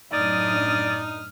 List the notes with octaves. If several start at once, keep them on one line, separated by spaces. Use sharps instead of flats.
F#2 A2 D4 D#4 D5 D#6 F6